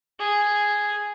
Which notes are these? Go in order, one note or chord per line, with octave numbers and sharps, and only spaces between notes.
G#4